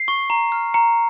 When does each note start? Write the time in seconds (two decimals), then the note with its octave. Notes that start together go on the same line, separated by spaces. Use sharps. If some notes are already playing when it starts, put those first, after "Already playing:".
Already playing: C7
0.08 C#6
0.30 A#5
0.52 F6
0.74 A#5 C#7